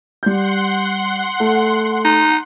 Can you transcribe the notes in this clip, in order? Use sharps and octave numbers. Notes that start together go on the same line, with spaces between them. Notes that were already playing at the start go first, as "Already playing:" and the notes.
G3 F#5 C6 G6
A3
D#4